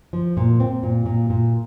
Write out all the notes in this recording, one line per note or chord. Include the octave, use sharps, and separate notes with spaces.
F3
A#2
C4
A#2
A#2
A#2